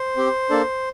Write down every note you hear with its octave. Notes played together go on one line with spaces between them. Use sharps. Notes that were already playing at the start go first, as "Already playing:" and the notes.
Already playing: C5
C4 G4
A#3 D4 A4